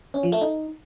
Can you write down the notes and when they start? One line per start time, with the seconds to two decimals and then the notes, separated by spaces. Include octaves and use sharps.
0.14 C#4
0.23 F3
0.32 A3
0.41 D#4